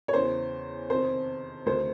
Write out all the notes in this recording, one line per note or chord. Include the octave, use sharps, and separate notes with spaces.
C#5
E2 C#3 E3 C5
F2 C3 D#3 C5
D2 C3 D#3 C5